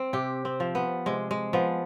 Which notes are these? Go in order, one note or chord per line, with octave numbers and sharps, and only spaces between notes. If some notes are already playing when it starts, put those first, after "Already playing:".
Already playing: C4
C3 G4
C4
F3
B3
C3 G#3
G#3
F3 B3